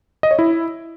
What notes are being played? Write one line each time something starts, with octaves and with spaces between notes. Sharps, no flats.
D#5
C#5
E4